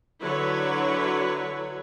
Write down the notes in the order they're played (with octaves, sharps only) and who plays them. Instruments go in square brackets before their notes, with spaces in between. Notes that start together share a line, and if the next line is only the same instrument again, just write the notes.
[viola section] D3 F#3 E4 B4 C#5